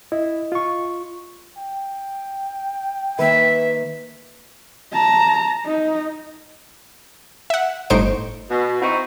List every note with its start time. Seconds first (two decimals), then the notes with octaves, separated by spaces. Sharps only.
0.12 E4 D#5
0.52 F4 C#6
1.57 G5
3.19 D#3 A#3 B4 E5
4.93 A5 A#5
5.66 D#4
7.50 E5 F#5
7.90 G1 A2 D#4 C5 C#6 D7
8.50 B2
8.81 C4 D#4 E4 F#4